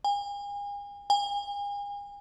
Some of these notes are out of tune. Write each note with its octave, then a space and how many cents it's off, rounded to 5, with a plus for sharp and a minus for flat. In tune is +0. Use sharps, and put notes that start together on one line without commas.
G#5 -40
G#5 -40